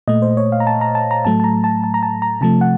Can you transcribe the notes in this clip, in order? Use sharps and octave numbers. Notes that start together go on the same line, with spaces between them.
A#2 A3 D#5
C5
C#5
F5
A#5
A5
A#5
A5
A#5
A2 F#3 A3 A5
A5
A#5
A5
A5
A#5
A5
A#5
C3 F3 A3 A5
F#5